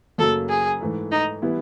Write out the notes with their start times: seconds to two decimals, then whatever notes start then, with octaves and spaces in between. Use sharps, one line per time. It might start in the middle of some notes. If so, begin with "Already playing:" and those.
0.18 F#2 C#3 F#3 A#3 C#4 A4
0.50 G#4
0.81 G#2 E3 A3
1.12 D#4
1.42 E3 G3 B3 E4